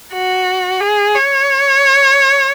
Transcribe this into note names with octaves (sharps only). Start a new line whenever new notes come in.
F#4
G#4
C#5